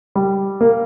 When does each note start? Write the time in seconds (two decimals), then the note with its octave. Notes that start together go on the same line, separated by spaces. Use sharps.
0.16 G3
0.61 A#3